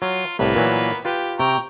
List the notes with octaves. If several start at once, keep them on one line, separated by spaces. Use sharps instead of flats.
F#3 F4
C2 A2 A#3 B3 B4
A#2 E3 F#3
F4 G4 B4
C3 G5 A#5 C#6